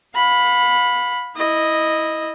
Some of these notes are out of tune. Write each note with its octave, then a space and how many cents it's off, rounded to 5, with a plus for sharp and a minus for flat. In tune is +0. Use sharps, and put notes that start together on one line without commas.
F5 +40 B5 +0
E4 -15 D#5 +0